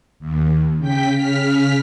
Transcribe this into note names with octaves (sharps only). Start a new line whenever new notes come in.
D#2
C#3 G5 B6
C#3 F6 B6